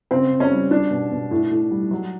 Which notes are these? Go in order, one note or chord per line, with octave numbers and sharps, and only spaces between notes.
C#3 C4
C#3
C#4
G3
G3 D4
B2
B2
A2
A2
G3
F#3